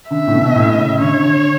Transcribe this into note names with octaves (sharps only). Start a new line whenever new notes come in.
D3 E5
A2
B2
B2
A2
C#3
D3 C#5
D3